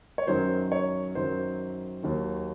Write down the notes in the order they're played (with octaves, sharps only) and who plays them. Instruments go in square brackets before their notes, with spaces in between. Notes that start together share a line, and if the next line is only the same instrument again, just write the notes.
[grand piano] C#5
F#2 D#3 F#3 C5
C#5
F#2 D#3 F#3 C5
D#2 D#3 F#3